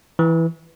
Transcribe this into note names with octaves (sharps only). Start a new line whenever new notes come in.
E3